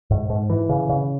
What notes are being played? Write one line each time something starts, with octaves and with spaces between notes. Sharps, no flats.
G#2
G#2
E3
C#3
C#3